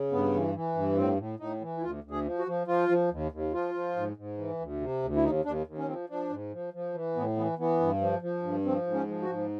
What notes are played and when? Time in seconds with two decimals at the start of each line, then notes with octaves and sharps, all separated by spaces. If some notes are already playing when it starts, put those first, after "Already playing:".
Already playing: C#3
0.12 G2 B3
0.33 E3
0.55 E3
0.75 G2
0.97 A2 C4
1.18 A2
1.39 A2 D#4
1.61 E3
1.77 E4
1.82 D2 F4
2.04 D2
2.11 G#4
2.25 F3
2.39 F#4
2.47 F3
2.67 F3 F4
2.89 F3
3.11 D#2
3.32 D#2
3.53 F3 F4
3.74 F3
3.96 G#2
4.17 G#2
4.38 E3
4.59 D2
4.81 C3
5.03 D2
5.16 E4
5.23 D#2 D#4
5.45 D#2 D4
5.67 D#2
5.78 C#4
5.88 F3 C4
6.09 F3 D4
6.30 G#2
6.52 F3
6.74 F3
6.94 E3
7.16 A2 B3
7.36 E3 B3
7.59 E3 B3
7.80 G2
8.01 F3
8.22 F3
8.43 G2
8.65 F3 C4
8.87 G#2
8.94 C#4
9.08 F3
9.22 F#4
9.29 G#2